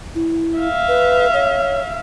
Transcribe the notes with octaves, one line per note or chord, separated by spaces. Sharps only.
E4
E5 F5
B4
C#5